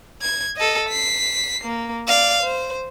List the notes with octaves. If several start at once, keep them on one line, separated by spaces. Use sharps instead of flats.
G#6
A4 D#5
B6 C7
A#3
D5 F5
C5